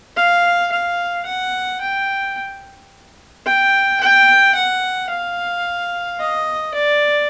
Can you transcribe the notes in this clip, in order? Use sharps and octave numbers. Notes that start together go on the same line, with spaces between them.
F5
F5
F#5
G5
G5
G5
F#5
F5
D#5
D5